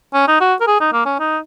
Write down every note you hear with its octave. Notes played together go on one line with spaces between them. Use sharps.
C#4
D#4
F#4
A#4
G#4
D#4
A#3
C#4
D#4